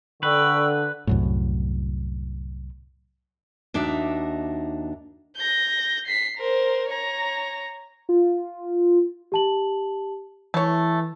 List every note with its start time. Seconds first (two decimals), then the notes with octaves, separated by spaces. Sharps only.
0.23 D3 B4 G5 C#6 E6
1.07 C2 F#2 A2
3.74 D#2 D4 D#4 F#4 E5
5.37 G6 A#6
6.07 B6 C7
6.38 A#4 C5
6.90 C#5 A#5
8.09 F4
9.32 G4 A5 F#7
10.54 E3 A3 C#5